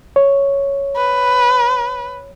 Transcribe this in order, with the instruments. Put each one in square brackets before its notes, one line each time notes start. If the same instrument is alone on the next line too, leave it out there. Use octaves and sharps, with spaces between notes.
[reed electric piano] C#5
[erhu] B4